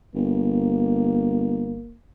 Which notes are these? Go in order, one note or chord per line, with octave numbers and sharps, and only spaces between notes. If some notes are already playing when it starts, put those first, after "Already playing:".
G1 A#3